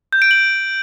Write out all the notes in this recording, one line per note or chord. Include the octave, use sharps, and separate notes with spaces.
G6
D7
F#7